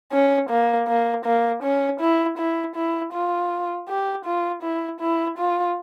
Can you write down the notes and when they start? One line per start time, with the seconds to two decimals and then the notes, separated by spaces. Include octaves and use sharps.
0.12 C#4
0.50 A#3
0.88 A#3
1.25 A#3
1.63 C#4
2.00 E4
2.38 E4
2.75 E4
3.13 F4
3.88 G4
4.25 F4
4.63 E4
5.01 E4
5.38 F4